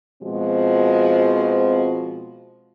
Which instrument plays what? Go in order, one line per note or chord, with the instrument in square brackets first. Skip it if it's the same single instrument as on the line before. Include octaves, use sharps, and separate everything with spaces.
[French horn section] B2 F3 G#3 C4 F#4